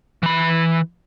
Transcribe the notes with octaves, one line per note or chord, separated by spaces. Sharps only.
E3 B5